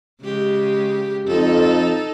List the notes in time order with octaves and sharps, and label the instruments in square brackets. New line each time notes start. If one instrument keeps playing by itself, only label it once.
[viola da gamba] C#3 G#3 G4
[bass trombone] F2 [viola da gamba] D#4 A4